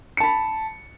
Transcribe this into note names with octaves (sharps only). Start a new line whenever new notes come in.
A5 B5 C#7